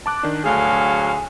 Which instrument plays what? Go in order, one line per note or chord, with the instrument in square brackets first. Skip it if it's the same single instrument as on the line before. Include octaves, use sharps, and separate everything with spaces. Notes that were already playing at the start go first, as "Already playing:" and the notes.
[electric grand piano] A5 D6 F#6
D#3 D4
[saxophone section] D2 F#3 F5 [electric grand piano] A3 G#4 [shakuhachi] G#5